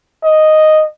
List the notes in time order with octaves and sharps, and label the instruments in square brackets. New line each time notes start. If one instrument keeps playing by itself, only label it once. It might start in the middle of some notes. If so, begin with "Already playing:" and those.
[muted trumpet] D#5